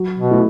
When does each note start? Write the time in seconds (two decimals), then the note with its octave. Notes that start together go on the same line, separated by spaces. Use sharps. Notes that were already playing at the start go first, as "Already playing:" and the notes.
Already playing: F#3
0.18 B2
0.31 A3 E4